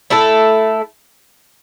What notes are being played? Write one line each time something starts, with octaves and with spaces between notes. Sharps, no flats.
A3 E4 A4